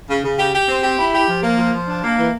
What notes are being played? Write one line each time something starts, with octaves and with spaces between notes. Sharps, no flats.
C#3
C#3
G4
G4
C4
G4
E4
G4
F3
A#3
F3
F3
D4
A#3
E3